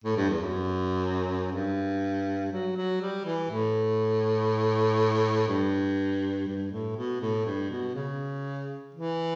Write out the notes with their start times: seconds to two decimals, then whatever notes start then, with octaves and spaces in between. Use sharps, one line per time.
0.04 A2
0.17 G2
0.29 E2
0.42 F#2
1.52 G2
2.52 F#3
2.76 F#3
3.01 G3
3.25 E3
3.50 A2
5.48 G2
6.47 G2
6.71 A2
6.96 B2
7.21 A2
7.46 G2
7.70 B2
7.95 C#3
8.94 E3